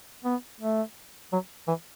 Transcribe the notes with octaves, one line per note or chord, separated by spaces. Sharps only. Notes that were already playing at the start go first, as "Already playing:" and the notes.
B3
A3
F#3
E3